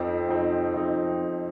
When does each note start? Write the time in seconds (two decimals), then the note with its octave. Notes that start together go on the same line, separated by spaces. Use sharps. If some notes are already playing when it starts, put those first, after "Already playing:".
Already playing: F2 F3 C4 D#4
0.29 F2 F3 C4 D#4
0.74 F2 F3 C4 D#4